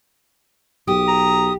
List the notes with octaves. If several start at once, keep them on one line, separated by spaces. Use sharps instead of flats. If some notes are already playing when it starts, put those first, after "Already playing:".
B1 G4 D#6
A#5